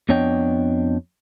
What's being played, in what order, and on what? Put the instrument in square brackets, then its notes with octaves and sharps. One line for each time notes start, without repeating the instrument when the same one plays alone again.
[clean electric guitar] F2 B3 D4 C#5 D#5 G5